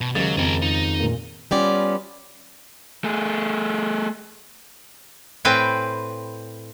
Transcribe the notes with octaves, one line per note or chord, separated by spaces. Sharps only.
B2
D#2 G#2 C#3 F#3 A6
F2 G#4 A#4
D#4
A#2 A#3
G3 B3 C#4 F4 D5
A3 G#4
A2 C4 B4 G5 G#5